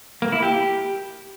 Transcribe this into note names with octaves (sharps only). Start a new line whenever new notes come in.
A#3
E4
G4